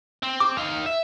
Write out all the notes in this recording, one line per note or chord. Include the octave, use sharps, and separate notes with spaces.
C4
D6
D#4 F5
E5